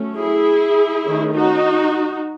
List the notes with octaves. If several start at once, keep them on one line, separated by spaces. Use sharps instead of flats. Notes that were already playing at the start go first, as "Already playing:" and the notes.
Already playing: F#3 A3 C#4
E4 G#4
D#3 A3 C#4
D#4 F#4